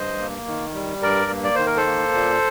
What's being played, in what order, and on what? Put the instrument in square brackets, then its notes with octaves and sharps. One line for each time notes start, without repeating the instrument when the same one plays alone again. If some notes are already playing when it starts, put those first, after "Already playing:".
Already playing: [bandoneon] G2 C5 D#5
A#3
D#3
G3
G2 A#4 D5
A#3
D5
D#3 C5
A#4
A4 C5
A#3
A#2